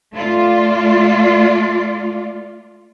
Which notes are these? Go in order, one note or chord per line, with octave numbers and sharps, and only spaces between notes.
A3 F4 D5